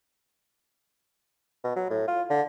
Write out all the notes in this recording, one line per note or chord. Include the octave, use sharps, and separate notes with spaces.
B2
F#3
A2
F4
D3